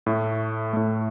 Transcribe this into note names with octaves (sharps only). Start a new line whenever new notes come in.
A2 A3
A2 A3